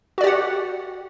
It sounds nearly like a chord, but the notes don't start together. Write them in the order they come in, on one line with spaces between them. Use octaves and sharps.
F#4 D5 G4 F#5